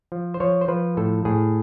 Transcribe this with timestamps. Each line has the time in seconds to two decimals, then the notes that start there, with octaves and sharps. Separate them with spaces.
0.12 F3
0.34 C5
0.40 F3 C#5
0.61 C5
0.68 F3 B4
0.97 A2 A4
1.25 A2 G#4